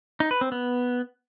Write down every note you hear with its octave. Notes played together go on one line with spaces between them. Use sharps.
D#4
B4
C4
B3